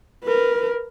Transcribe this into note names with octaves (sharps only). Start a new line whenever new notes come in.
A#4 B4